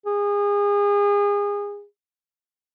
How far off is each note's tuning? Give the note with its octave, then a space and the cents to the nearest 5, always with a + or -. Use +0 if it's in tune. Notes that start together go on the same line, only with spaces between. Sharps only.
G#4 -30